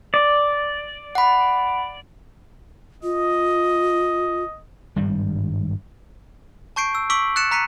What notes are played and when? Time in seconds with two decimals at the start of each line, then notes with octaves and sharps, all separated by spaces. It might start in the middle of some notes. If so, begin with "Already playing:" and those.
0.14 D5
1.15 F#5 B5
3.03 F4 D#5
4.96 G#1 G2 G3
6.76 A5 C#6 G6 C7 D7
6.95 E6
7.10 C#6 D6 E6 B6 D7 F#7
7.36 F#6 A6 C#7 E7
7.51 A#5 F#6 B6 C#7 D#7